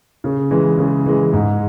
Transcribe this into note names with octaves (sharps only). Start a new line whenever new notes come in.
C#3
E3 G#3
C#3
E3 G#3
G#2